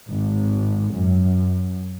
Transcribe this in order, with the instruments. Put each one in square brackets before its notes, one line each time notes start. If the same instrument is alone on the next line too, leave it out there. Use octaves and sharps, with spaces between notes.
[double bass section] G#1
F#2